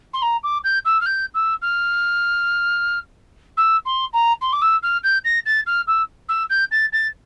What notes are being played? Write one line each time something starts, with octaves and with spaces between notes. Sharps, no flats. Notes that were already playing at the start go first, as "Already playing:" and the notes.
C6
A#5
D6
G6
E6
F6
G6
E6
F6
E6
C6
A#5
C6
D6
E6
F6
G6
A#6
A6
F6
E6
E6
G6
A6
A6